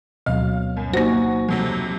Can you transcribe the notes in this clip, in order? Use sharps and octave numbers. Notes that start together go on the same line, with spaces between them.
D2 B2 F#3 F5
F#2
A#3 D#4 F#4 C5 F#5 G#5
F2 C3 F#3